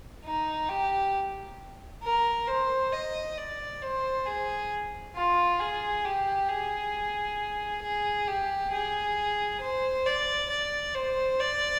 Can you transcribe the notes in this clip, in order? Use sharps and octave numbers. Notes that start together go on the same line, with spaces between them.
D#4
G4
A#4
C5
D#5
D5
C5
G#4
F4
G#4
G4
G#4
G#4
G4
G#4
C5
D5
D5
C5
D5